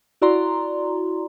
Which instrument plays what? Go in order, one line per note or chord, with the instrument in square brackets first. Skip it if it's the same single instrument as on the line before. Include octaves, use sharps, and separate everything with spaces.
[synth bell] E4 F#4 D5 A#5 C6